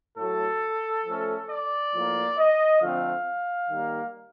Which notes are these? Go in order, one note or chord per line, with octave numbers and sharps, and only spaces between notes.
A2 F#3 A3 A4
F3 A3 C#4
D5
A2 F3 A#3
D#5
D3 F3 A3 C4 F5
D#3 G3 A#3